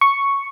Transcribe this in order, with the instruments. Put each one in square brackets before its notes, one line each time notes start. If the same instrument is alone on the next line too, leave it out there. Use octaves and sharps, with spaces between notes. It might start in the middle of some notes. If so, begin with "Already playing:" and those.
[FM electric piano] C#6